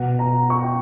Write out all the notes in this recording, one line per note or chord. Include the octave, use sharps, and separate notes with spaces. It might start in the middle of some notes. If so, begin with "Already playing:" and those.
Already playing: B2 F#5
A#5
C#6
G5